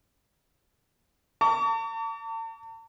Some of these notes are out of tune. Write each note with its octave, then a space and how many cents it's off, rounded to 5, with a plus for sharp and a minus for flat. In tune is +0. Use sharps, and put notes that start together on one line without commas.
A5 +40 C#6 +45